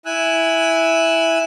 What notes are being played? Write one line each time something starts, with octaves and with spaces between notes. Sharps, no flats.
E4 G#5 E6 F#6